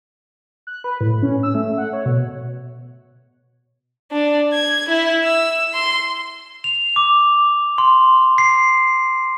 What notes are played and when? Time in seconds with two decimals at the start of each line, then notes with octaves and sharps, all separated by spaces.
0.67 F#6
0.84 B4
1.01 A2
1.23 C#4
1.43 E6
1.55 A3
1.78 F#5
1.93 C#5
2.06 B2
4.12 D4
4.54 G#6
4.88 E4
5.24 E6
5.74 C6
6.64 F7
6.96 D6
7.78 C6
8.38 C7